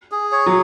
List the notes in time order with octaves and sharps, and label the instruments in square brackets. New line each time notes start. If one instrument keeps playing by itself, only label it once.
[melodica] G#4
C#5
[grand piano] F#3